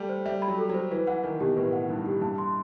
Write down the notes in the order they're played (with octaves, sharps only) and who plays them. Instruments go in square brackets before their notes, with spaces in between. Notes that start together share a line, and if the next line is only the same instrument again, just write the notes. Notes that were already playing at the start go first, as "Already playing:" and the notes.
Already playing: [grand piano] G3 A3
[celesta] C5
[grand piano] G3 [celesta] E5
[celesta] B5
[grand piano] F#3
[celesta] A4
[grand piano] F#3 [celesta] C5
[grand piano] E3 [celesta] B4
[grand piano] E3 [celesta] F#5
[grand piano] D#3 [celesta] D#4
[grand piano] B2 [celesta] G4
[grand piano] A2 [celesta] B4
[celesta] F#5
[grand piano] G2 [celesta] D#4
[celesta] G4
[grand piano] G2 [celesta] A5
[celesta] C6